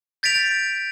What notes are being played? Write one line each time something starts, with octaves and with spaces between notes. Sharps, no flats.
G6 A6 B6 D7 F7